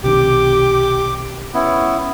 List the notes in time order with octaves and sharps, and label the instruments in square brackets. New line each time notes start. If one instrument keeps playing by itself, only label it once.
[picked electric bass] B1 C3 D#3 [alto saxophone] G4 [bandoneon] D6
[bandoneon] B3 E4 [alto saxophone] C#4